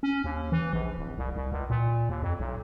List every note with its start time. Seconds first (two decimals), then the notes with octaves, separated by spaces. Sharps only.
0.03 C#4
0.24 D#2
0.52 E3
0.73 A#1
0.98 D1
1.18 C2
1.36 C2
1.52 C#2
1.70 A#2
2.09 D#2
2.23 F2
2.40 B1